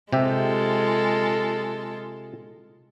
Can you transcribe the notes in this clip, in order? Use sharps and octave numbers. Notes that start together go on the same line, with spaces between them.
C3 G#3 F4 G4 A4 E5